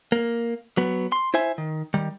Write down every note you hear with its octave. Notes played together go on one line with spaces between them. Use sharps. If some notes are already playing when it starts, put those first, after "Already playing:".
A#3
F#3 B3
C6
E4 C5 E5 G#5
D#3
D#3 G3